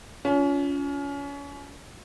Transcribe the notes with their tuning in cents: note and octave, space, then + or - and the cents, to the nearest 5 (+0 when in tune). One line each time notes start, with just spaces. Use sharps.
C#4 +30 F4 +0